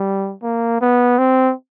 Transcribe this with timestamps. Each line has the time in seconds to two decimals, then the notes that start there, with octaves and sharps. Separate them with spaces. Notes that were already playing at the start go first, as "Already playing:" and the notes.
Already playing: G3
0.42 A#3
0.81 B3
1.19 C4